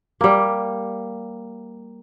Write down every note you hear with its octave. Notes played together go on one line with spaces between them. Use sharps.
G3 A#3